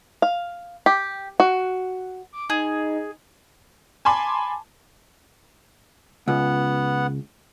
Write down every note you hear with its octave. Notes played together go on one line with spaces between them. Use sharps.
F5
G4
F#4
D6
D#4 G#4
G#5 A5 B5 C6 D6
C#2 B3 F#5